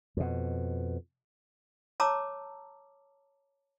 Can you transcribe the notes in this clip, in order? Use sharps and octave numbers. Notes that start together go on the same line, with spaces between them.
F2 B2
C#5 A5 A#5 D6 E6